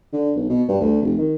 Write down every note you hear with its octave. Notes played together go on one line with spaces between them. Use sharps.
D3
B1
B2
G2
D2
F1
D#3